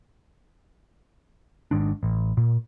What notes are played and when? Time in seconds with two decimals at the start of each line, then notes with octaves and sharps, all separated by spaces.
1.71 G#1 G#2 D#3 D4
2.03 A1
2.37 A#2